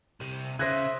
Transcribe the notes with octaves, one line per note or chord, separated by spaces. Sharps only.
C2 C3
C#3 C5 E5 D#6 F#6 G#6 A#6